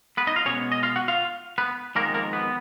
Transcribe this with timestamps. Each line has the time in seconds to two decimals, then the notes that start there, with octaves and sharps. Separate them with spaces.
0.17 B3 B4
0.27 D#4 D#5
0.36 F4 F5
0.45 B2 G#3 B3 C#4 C#5
0.72 D#5
0.83 F4 F5
0.96 F#4 F#5
1.08 F4 F5
1.58 B3 B4
1.95 F2 D#3 G#3 A#3 B3 A#4
2.14 A#3 A#4
2.33 B3 B4